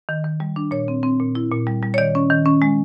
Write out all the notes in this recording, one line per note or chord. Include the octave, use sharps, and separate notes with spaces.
D#3
D#3
G3
D4
A#2 C#5
C4
C4
A#2
E4
A#2
G3
G3
C#5
D#3 D5
C#4
D#3
C#4
G#3